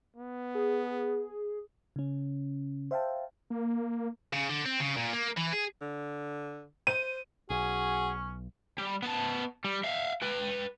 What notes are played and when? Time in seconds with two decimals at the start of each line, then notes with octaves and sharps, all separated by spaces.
0.16 B3
0.55 G#4
1.96 C#3 C#4
2.91 C5 E5 F5 G5 A5
3.50 A#3
4.33 C#3
4.49 D3
4.65 C4
4.80 C#3
4.97 A#2
5.14 A#3
5.37 E3
5.53 G#4
5.81 D3
6.87 C5 D#7
7.50 B1 C#4 F#4 G#4
8.78 G3
9.03 B3 A5
9.65 G3
9.84 E5 F5
10.22 B4 G5